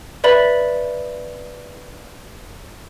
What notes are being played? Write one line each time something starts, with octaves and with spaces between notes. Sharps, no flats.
B4 D5 E5 B5 F#7